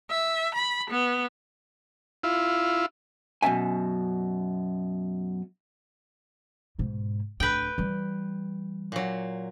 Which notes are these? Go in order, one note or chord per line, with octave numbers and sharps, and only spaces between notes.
E5
B5
B3
E4 F4
F#2 B2 C#4 E5 G#5
G#2 B2
D1 D4 B4 G5
E3 G3
A#2 F#3